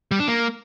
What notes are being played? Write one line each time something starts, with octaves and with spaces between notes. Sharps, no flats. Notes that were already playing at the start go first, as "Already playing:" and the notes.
G3
D4
A#3